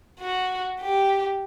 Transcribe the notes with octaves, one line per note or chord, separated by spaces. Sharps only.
F#4
G4